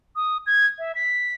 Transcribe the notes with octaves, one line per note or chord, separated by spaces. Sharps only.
D#6
G#6
E5
B6